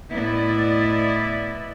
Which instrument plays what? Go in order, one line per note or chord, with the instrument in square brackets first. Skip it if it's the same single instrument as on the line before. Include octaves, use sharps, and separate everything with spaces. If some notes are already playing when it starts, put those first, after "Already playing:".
[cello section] A2 B3 E4 D5 D#5